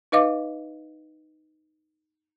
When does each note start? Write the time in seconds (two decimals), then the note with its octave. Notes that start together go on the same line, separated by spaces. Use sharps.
0.12 D#4 B4 D#5 F5 D6